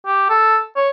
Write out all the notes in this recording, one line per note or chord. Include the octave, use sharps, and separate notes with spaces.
G4
A4
C#5